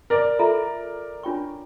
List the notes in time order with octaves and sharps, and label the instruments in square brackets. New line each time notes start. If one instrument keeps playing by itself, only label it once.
[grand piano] A#4 D5
[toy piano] F4 A4 E5 A#5
D4 F4 C#5 G5 C#6